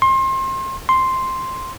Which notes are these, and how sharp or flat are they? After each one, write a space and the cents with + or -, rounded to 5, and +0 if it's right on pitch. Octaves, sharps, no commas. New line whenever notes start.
C6 +30
C6 +0